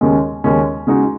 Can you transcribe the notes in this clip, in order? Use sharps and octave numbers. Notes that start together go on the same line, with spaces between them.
D#2 C#3 G#3 C#4
D#2 C#3 G#3 C#4
C#3 G#3 D#4 F#4